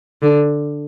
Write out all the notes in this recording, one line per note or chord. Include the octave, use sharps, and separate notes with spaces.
D3